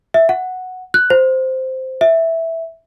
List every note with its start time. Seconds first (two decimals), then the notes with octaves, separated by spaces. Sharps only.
0.14 E5
0.29 F#5
0.94 F#6
1.10 C5
2.01 E5